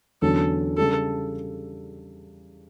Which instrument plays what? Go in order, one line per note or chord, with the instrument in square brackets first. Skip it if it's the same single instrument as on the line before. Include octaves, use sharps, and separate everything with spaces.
[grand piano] E2 D3 F#3 C#4 F#4 [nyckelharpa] A4
[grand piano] C#3 G3 D4 G4 [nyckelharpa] A4